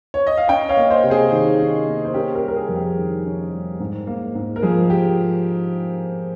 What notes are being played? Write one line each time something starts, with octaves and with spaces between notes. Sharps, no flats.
C#5
D#5
F5
C#4 D#5 G5
C#5 F5
A#3
C5 D#5
C3
G#4 C5
D#3
C#4
A#3
C5
C#4 G4 A#4
G4 A#4
G3
A#4
G#4
F2
G4
D#3
C#4
G3
G#2
A#3
G#2
A#4
F3 G#4
G4